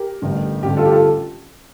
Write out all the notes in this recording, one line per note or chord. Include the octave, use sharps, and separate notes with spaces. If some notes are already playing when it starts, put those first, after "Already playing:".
Already playing: G4 A#4
A1 G2 D3
A1 G2 D3 G3 G4
F4 A4
G4
F4 A4